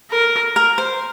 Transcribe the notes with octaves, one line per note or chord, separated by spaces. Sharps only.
A#4
A#4
C5